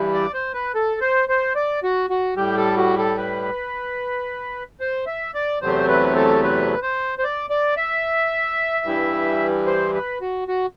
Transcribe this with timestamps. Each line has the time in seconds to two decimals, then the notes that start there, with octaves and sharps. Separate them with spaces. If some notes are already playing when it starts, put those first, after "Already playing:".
Already playing: G2 E3 G3
0.14 D5
0.34 C5
0.54 B4
0.75 A4
1.01 C5
1.29 C5
1.55 D5
1.83 F#4
2.10 F#4
2.36 A2 G3 G4
2.57 A4
2.77 F#4
2.98 A4
3.17 B4
4.80 C5
5.07 E5
5.34 D5
5.61 E2 C3 F#3 A3 C5
5.88 B4
6.16 A4
6.43 B4
6.82 C5
7.19 C5
7.24 D5
7.50 D5
7.77 E5
8.85 G2 E3 G3
9.66 C5
9.94 B4
10.21 F#4
10.48 F#4